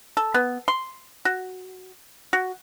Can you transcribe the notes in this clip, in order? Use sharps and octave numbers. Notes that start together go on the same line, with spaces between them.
A4
B3
C6
F#4
F#4